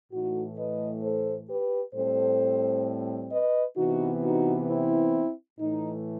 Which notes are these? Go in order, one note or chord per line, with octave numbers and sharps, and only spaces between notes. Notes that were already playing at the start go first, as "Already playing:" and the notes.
A2 E3 A3 D#4 F#4
B4 D#5
A4 C5
G4 B4
A2 G3 C4 A4 C5
B4 D#5
C3 E3 B3 D#4 F#4
D#4 F#4
C4 E4
A2 E3 A3 D#4